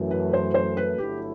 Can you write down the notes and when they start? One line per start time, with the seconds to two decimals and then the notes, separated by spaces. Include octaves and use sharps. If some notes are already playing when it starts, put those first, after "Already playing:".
Already playing: F#2 E3 A3
0.11 B4
0.33 C5
0.54 C5
0.77 B4
0.98 G1 G2 F#3 A3 E4 G4